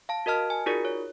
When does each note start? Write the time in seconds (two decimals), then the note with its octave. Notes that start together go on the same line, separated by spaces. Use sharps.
0.09 F5 A5
0.26 F#4 A#4 D#5 A5 F6
0.50 G#5
0.66 D#4 F4 F#4 G#4 A#4 D5
0.85 C#5